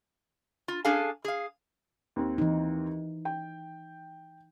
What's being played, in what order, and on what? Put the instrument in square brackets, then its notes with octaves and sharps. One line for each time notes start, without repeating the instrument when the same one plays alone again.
[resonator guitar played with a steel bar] F4
C#4 D4 G#4 A4 F5 G#5
G#4 F5
[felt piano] D#2 C4
[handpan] E3 D#4
[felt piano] G5